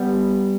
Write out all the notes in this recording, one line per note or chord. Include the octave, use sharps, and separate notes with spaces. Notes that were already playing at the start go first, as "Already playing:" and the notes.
Already playing: G3 B3